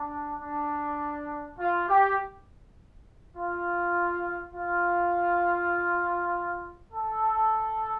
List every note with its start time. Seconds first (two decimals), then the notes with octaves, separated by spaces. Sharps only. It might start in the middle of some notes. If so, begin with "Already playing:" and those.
Already playing: D4
0.40 D4
1.59 F4
1.88 G4
3.37 F4
4.55 F4
6.93 A4